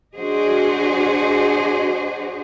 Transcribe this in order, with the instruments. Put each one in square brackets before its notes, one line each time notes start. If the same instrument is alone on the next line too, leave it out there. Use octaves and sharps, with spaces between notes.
[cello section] D4 F#4 G#4 C5 D#5